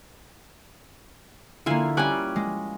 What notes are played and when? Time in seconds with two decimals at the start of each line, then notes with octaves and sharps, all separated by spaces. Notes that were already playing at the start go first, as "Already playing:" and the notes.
1.66 D3 A#3 E4 F4 G#5
1.97 G3 C#4 G#5 D6 F#6
2.36 G#3